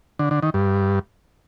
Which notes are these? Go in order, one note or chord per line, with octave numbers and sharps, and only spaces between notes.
D3
D3
D#3
G2